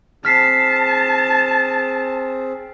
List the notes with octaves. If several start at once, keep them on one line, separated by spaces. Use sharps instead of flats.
C4 G#4 A5 F6 B6 C7